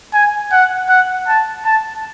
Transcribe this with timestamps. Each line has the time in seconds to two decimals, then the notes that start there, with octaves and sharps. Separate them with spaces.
0.13 G#5
0.52 F#5
0.89 F#5
1.28 A5
1.66 A5